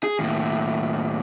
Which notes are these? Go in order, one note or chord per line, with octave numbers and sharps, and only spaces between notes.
G#4
D#2 A2